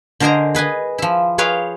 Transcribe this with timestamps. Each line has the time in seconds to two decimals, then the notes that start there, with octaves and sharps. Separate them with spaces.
0.20 D3 A#4 C5 D#5 G#5 A#5
0.55 G#4 B4 D#5 G#5
0.98 F3 E4
1.38 G#4 B4 C#5 F5 G5